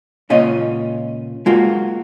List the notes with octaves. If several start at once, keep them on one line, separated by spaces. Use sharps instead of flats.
C#2 A#2 C#4 F4 D#5
G#3 A#3 F4 F#4